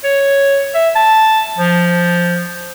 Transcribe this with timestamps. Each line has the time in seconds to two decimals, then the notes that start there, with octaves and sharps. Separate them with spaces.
0.04 C#5
0.74 E5
0.95 A5
1.58 F3